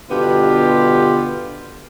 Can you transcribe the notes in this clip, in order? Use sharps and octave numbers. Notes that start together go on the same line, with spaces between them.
G2 B2 D3 B3 F4 G4